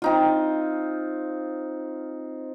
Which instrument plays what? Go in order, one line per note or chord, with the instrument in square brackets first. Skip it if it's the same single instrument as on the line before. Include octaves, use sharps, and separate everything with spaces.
[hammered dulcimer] C4 D#4 F4